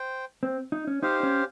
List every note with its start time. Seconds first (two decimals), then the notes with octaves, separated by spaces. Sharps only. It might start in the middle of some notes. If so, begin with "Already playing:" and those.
Already playing: C5 G5
0.43 C4
0.72 D#4
0.87 C#4
1.02 D#4 G4 C5 F5
1.23 C#4